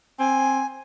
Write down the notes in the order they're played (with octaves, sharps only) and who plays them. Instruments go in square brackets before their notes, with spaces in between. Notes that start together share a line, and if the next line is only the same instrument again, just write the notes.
[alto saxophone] C4 [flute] G#5